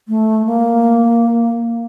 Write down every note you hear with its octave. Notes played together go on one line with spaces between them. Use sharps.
A3
A#3